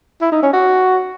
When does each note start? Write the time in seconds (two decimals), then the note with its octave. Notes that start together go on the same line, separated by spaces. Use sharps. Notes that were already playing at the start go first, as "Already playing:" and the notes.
0.22 E4
0.32 D#4
0.43 C#4
0.53 F#4